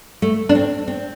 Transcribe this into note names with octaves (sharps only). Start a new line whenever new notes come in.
A3
D4
C4
C4